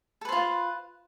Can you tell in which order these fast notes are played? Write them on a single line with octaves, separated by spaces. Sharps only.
A4 B4 C5 F4